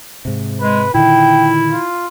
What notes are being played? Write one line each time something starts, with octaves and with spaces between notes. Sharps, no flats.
G#2 C3
G#3 B4
A#2 D3 D#3 E4 G5
F4